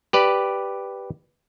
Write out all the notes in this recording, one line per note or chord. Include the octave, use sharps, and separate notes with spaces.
G4 B4 D5